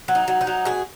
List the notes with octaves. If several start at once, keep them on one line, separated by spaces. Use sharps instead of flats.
F#3
D#4
F#3
D#4
F#3
B2 G#4